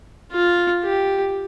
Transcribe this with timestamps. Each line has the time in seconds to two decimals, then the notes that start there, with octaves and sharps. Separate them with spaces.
0.32 F4
0.84 G4